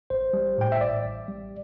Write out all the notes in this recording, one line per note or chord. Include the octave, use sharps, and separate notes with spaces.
A1 C5
G3
A2 G5
E5
A1 D5
A1
G3